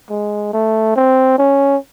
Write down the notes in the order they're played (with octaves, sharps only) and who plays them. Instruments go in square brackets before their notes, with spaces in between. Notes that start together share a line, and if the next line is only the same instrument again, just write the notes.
[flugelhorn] G#3
A3
C4
C#4